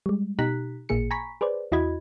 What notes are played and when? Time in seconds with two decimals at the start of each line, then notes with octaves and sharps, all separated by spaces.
0.06 G3 G#3
0.39 B2 D#4 G4 A#5 F#6 B6
0.89 A1 A#2 A#3 G#4 C#7
1.11 G#5 A#5 B5 C#6 B6
1.41 G#4 B4 C5 D5
1.72 E2 E4 F#4 D#5 B5 G#6